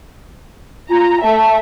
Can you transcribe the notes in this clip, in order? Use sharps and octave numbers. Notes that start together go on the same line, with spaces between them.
F4 A#5
A3 E5 A5